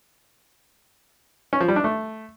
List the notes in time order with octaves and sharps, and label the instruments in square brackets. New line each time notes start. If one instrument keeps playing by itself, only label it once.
[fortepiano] C#4
F3
G3
D4
A3